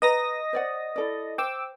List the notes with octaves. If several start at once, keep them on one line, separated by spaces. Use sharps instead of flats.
B4 D#5 A#5 D#6 A#6
C5 D5 F#5
E4 A4 D5
C5 G5 D6 E6